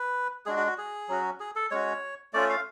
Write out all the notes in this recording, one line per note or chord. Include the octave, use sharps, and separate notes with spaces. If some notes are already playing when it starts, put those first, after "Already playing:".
Already playing: B4
G#3 D4 F#4 G#4
F#4
F#4
G#4
F#3 C#4 F#4
G#4
A4
G#3 C#4 F#4 C#5
A3 C#4 F4 D5
F5